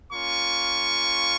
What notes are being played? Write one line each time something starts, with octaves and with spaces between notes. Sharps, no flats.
A#3 C#4 F4 C#6